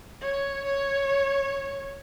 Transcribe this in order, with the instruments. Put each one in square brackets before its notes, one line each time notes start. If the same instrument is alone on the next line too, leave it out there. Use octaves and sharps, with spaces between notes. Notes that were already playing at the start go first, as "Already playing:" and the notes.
[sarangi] C#5
C#5